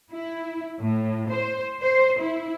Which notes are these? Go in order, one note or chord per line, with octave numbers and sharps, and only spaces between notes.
E4
A2
C5
C5
E4